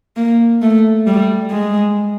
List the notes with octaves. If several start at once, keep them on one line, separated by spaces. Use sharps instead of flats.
A#3
A3
G3
G#3